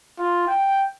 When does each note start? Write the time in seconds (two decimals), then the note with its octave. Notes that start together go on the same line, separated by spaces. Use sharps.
0.19 F4
0.48 G5